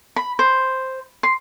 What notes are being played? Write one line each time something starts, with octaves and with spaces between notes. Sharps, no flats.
B5
C5
C6